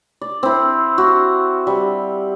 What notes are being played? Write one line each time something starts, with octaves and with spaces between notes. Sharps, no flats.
D5
C4 E4
F#4
G3